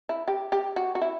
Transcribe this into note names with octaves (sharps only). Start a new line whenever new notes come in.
E4
G4
G4
F#4
F#4
E4